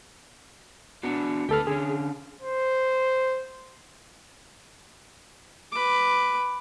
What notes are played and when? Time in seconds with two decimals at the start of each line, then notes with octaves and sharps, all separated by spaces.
1.03 B3 D4 F#4
1.49 D2 G4 A4 B4 F6
1.67 D3 C#4 G#4
2.42 C5
5.72 B4 D6